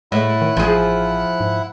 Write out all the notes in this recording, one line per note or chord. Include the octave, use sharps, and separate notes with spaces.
A2 G#3 E4 F#5
D#3
A1 F3 G#4
G#2